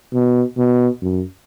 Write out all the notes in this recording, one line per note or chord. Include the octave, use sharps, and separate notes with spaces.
B2
B2
F#2